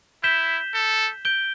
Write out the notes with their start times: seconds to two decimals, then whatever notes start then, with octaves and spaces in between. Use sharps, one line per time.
0.23 E4 G6 B6 E7 G7
0.74 A4
1.25 G6 D7 G7